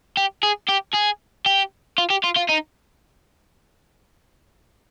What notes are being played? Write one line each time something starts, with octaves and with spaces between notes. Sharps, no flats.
G4
G#4
G4
G#4
G4
F4
G4
F4
F4
D#4